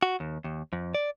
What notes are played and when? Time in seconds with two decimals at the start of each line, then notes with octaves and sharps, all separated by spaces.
0.03 F#4
0.20 D#2
0.44 D#2
0.73 F2
0.95 D5